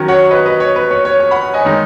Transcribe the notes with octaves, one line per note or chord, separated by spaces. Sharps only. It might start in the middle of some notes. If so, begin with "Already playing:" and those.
Already playing: D#3 F#3 C#4
C#5 F#5
C#5
B4 D#5
B4 D#5
C#5
B4
C#5
C#5
C#5
F#5 B5
D#5 G#5
D#3 G#3 D#4